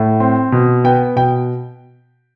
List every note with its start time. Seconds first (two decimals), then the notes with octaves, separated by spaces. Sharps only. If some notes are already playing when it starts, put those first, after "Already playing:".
Already playing: A2
0.20 C4
0.52 B2
0.84 B3 G5
1.16 B2 G5